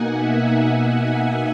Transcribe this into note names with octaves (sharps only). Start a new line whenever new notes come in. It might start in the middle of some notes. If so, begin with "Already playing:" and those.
Already playing: B2 A#3 D#4 F#5 G#5
E5
F#5